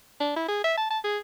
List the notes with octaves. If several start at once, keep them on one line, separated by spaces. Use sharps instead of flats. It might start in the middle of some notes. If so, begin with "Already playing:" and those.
D4
E4
G#4
E5
A5
A5
G#4